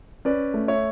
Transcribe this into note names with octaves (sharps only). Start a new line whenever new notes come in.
C#4 B4 D5
A3
C#5 E5